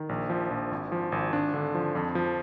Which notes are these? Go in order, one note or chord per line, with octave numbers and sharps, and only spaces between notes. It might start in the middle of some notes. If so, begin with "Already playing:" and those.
Already playing: D#3
A#1
F3
A#1
G#1
F3
G#1
G#1 D4
D3
F3
F2
F3